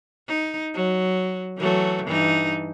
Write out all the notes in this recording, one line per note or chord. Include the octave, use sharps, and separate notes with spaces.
D#4
F#3
E3 F#3 A3
G2 E3 D#4